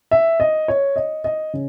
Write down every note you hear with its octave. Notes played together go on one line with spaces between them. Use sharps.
E5
D#5
C#5
D#5
D#5
C#3